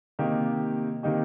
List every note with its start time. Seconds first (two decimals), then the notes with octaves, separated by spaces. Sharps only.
0.19 C3 D#3 A#3 D#4 G4
1.03 C3 D#3 A#3 D#4 G4